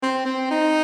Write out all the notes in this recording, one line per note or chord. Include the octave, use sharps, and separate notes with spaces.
C4
C4
D#4